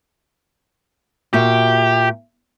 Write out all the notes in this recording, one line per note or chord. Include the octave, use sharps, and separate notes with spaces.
A#2 F#4 G4 E5